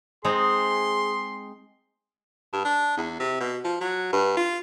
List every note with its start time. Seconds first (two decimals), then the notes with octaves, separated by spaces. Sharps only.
0.25 G#3 C4 D#4 G#4 C6
2.53 G2
2.65 D4
2.97 E2
3.20 C3
3.40 B2
3.64 F3
3.80 F#3
4.13 G2
4.37 F4